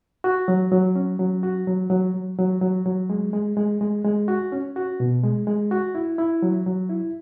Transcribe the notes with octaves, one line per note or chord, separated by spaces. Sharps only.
F#4
F#3
F#3
C#4
F#3
F#4
F#3
F#3
F#3
F#3
F#3
F#3
G#3
G#3
G#3
G#3
G#3
F#4
C#4
F#4
B2
G#3
G#3
F#4
E4
E4
F#3
F#3
E4